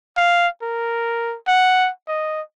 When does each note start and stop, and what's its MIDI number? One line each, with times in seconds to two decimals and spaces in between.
0.17 0.48 77
0.62 1.35 70
1.48 1.89 78
2.08 2.41 75